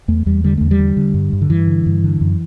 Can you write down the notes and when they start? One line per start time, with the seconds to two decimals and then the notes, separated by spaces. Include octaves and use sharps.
0.08 E2 A3
0.26 E2 G3
0.44 D3 G3
0.57 E2 A3
0.71 G3
0.79 D3
0.97 D3
1.14 G2
1.33 G2
1.42 D3
1.50 G2 E3
1.67 D3
1.86 G2
2.04 D3
2.21 F#2